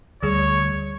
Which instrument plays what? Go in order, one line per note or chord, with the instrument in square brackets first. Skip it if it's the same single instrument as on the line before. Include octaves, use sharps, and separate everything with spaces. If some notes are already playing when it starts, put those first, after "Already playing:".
[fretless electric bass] D2 [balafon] G3 G#4 [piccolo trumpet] C#5